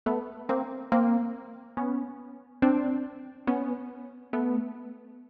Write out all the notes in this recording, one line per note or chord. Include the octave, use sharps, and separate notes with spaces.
A3 B3
A#3 C4
A#3 C4
B3 C#4
C4 D4
B3 C#4
A3 B3